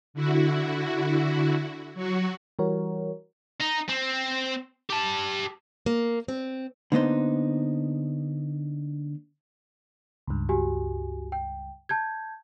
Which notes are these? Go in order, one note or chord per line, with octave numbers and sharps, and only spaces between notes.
D3 E4 F#4
F#3 F#4
E3 G3 F#4 A#4 C#5
D#4
C4
G4 A5
A#3
C4
D3 A#3 B3 D#4 C5
C#2 G2
F#4 G4 G#5
G5
A5 G6 G#6